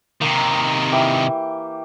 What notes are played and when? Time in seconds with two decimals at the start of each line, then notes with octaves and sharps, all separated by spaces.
0.22 C3 D#3 A#3
0.92 E3 G4 C#6